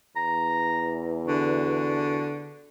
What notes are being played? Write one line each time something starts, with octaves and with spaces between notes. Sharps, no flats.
E2 A#5
D3 F#4